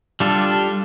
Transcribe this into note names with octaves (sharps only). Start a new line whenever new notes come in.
G3 D4 F4 A4